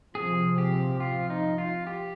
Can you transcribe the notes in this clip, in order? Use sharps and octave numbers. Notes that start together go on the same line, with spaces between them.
C3 F3 C4 G#4
G4
F4
D#4
F4
G4